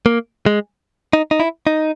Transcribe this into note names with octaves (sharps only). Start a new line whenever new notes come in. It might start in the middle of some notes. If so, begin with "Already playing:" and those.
A#3
G#3
D#4
D#4
E4
D#4